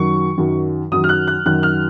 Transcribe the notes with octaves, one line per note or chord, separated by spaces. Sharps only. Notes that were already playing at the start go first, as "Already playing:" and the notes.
Already playing: F#2 D#3 F#3 C#6
F#2 D#3 F#3
F#2 D#3 F#3 D#6
F6
F#6
F#6
F#2 D#3 F#3 F#6
F6